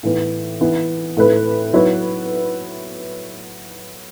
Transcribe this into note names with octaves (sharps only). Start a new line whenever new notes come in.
A2 E3 B3
E3 B3 E4
A2 A3 E4 B4
F#3 B3 E4 B4